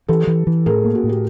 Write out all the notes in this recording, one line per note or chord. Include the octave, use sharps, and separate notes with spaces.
E3 G4 A4
E3
E3
A2 G#4 A#4
A#3
F#4
A2
G4